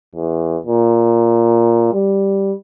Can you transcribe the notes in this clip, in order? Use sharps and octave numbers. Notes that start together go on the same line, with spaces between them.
E2
A#2
G3